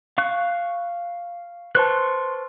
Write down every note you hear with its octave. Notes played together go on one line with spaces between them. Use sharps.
F5 C#6 F#6
B4 C5 A5 C6 C#6 F#6